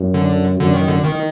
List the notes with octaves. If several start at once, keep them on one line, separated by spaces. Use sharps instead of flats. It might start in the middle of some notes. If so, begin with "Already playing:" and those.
Already playing: F#2
D3
F#2 D3
D#3
D3
D#3